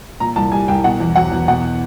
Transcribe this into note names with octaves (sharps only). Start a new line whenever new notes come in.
A#2 A#5
C2 A5
G3 G#5
C2 G5
B2 F#5
E2
F#3 F#5
E2
B2 F#5